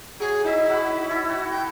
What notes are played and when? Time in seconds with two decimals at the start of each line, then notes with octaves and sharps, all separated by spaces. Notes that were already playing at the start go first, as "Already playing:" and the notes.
0.20 F#3 G#4
0.44 D#4 E4 E5
0.69 F#3 F#5 B5
1.09 E4 A4 E5
1.29 E4 F#4 E6
1.50 G5